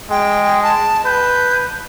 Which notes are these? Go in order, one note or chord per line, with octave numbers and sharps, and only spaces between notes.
G#3 G5
A5
B4 G6